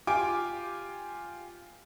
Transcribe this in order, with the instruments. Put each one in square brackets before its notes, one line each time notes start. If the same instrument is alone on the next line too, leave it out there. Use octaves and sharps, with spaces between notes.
[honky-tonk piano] F4 G4 G#5 D6 D7